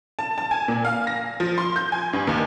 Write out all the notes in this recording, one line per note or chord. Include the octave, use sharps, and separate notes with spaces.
A5
A5
G#5
A#2
F5
A#6
F3
C6
G6
G#5
G2
D#2